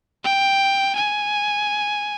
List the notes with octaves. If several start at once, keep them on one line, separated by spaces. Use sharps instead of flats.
G5
G#5